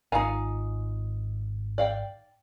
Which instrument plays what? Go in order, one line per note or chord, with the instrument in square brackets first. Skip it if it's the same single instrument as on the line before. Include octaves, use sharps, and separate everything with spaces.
[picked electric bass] G#1 [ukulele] D#4 G#5 [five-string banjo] F4 F5 A#5
[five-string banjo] D5 F5 G5